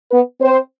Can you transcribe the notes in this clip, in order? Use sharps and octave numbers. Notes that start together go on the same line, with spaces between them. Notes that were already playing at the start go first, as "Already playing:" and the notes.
B3 B4
C4 C5